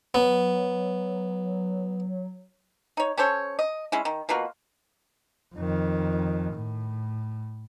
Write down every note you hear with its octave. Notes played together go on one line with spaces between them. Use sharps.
F#3 B3
D#4 C#5
C#4 A4 C5 C#5
D#5
G#3 C#4 E4
D#3
B2 A#3 F4 F#4
F2 D#3
A2